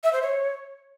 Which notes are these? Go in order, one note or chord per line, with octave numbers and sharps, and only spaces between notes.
E5
C5
C#5